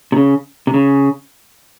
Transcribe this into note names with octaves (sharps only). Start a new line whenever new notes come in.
C3
C#3
C3
C#3